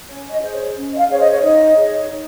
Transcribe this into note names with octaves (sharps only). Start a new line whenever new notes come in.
C#4 C#5
D#5
G#4 C5
C#5
C#4
D#5
F5
G#4 C5 C#5
D#5
C#5
D#4 D#5
G#4 C#5
D#4